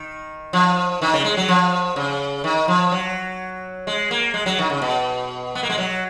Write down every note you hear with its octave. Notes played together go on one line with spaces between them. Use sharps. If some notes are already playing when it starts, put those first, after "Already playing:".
Already playing: D#3
F3
D#3
C#3
G#3
F#3
F3
C#3
D#3
F3
F#3
G#3
A#3
G#3
F#3
D#3
C#3
B2
B3
A#3
G#3
F#3